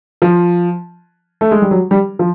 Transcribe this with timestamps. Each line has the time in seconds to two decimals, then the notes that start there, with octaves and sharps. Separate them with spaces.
0.22 F3
1.41 A3
1.51 G#3
1.62 G3
1.71 F#3
1.91 G3
2.19 F3